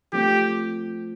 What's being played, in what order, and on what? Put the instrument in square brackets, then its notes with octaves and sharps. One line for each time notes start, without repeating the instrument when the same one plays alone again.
[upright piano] F3 A3 C4 F4 [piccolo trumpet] G4